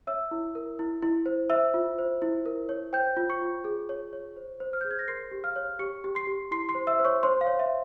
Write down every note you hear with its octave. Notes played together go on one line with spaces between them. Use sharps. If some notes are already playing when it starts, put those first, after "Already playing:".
C#5 E5 E6
E4
A#4
E4
E4
C5
C5 E5 E6
F4
C5
E4
A#4
C#5
C5 G5 G6
F4
C#6 C#7
F4
G#4
C#5
C#5
C5
C5
F6
G#4 G6
G#6
A#6
A#4 C6 C7
G4
F5 F6
C#5
G4 C#6 C#7
G4
C6 C7
G4
E4 C6 C7
C6 C7
C5
E5 E6
C5
C#5 C#6
C5 C#5 C6
F5
C#5
E5